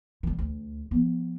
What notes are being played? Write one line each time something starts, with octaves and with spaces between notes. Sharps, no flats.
D#3 G3
D2
F3 B3